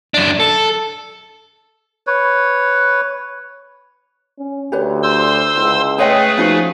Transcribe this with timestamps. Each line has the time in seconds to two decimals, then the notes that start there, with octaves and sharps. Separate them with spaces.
0.14 F#2 D4
0.40 A4
2.07 B4 C#5
4.38 C#4
4.72 D2 G4 B4 C#5
5.03 C5 C6 E6
5.57 C#2 E4
5.98 A3 G#4 B4 C#5 D#5 G5
6.37 F3 C#4 D#4 F#4